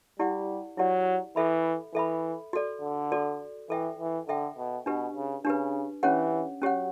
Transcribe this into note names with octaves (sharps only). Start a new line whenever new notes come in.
G3 E4 G4 D5 F#5
F#3 E4 G4 D5 F#5
E3 A4 E5 B5
E3 A4 E5 B5
F#4 A4 D5
D3
F#4 A4 D5
E3 A4 E5 G5
E3
D3 A4 E5 G5
B2
B2 D4 G4 B4
C#3
C#3 D4 G4 B4
E3 C#4 G4 C#5 F#5
F#3 C#4 G4 C#5 F#5